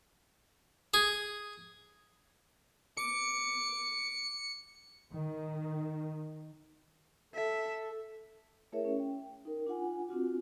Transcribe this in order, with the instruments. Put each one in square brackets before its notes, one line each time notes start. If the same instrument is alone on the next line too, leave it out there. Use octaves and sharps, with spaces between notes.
[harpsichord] G#4
[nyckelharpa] D6 [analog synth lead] C#7
[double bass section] D#3
[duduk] A4 [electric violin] E5
[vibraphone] A3 E4 G#4 A#4 C#5 E5
C#4
G5
D#4 A#4
D4 F4 F#5 G#5
C4 D4 F4 F#4